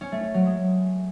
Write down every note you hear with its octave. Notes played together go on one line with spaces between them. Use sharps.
C#4
A3
C#4
F#3
G#3